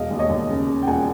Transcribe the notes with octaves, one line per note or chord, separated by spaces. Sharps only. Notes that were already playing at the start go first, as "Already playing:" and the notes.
Already playing: E1 D#5 F5
D#2
C#5 D#5
D#2
C#3
C#3
G5
E1 F#5 G#5